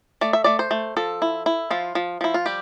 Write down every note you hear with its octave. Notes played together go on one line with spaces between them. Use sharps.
A3 D5
E5
A3 D5
C5
A3
F3 A4
E4
E4
F3 F4
F3
F3 E4
F4
G3 G4